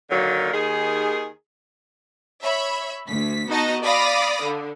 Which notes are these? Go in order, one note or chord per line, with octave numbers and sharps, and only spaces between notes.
A#2 D3 D#3 F#3 A#3
D#2 D#3 G#4
C#5 E5 B5
D2 B6
B3 D#4 F#4 D#5 A5 A#5
D5 F5 B5 D6 D#6 A#6
D3